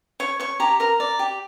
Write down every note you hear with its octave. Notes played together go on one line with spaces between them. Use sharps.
C#5 C#6
C#5 C#6
G4 A#5
A#4 A#5
D5
G4